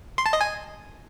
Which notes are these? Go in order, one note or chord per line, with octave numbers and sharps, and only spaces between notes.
C6
A5
D#5
G#5